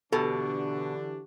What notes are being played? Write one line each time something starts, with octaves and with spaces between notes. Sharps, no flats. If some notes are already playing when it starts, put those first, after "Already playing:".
B2 D3 E3 D4 G4 A4